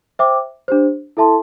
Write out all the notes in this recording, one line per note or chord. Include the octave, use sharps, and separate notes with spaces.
C5 E5 G5 D6
D4 G4 C5
E4 A4 E5 A5 C6